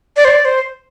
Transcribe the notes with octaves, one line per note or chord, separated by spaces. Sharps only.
D5
C5
D5
C5